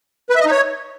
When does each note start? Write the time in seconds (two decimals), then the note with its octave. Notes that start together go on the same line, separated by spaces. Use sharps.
0.30 B4
0.35 E5
0.41 D#5
0.46 D#4
0.51 C#5